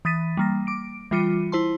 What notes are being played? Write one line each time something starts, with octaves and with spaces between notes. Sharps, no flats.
E3 D#6 A6 B6 D#7
G3 A#3 A#6
D6 D7
E3 G3 F4 D6 C#7 D#7
E4 C5 A5 C6